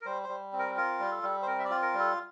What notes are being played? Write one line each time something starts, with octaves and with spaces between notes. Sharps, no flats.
A#4
G3 C5
C5
G3
C4
A#4
F4 A#4
G3
A4
G3
C5
C4 A#4
E5
D5
F4
A#4
G3
A4